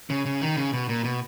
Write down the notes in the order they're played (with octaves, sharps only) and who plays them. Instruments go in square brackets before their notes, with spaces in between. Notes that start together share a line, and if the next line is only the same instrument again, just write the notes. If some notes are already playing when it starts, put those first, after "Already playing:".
[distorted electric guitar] C#3
C#3
D#3
C#3
B2
A#2
B2